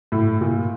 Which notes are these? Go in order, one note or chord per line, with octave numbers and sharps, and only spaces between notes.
A2
A#2